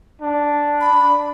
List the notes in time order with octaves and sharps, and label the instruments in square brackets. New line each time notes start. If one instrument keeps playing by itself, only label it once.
[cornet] D4
[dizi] B5